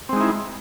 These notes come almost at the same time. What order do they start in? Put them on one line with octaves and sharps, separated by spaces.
C4 G#3 D#4 E4